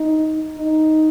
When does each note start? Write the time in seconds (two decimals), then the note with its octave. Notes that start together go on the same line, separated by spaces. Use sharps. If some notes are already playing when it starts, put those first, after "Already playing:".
Already playing: D#4
0.58 D#4